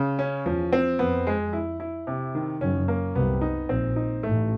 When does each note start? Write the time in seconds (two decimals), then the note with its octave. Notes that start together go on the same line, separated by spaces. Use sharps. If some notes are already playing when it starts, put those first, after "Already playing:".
Already playing: C#3
0.19 C#4
0.46 E2 F3
0.73 C4
0.99 F2 B3
1.27 G#3
1.53 E4
1.80 E4
2.07 C3
2.35 D#3
2.61 F#1 F#2 C#4
2.88 A#3
3.15 C2 C3 B3
3.41 D#4
3.69 A#1 A#2 C4
3.96 D#4
4.23 A1 A2 A3